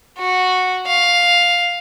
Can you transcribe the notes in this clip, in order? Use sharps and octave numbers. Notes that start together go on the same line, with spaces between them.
F#4
F5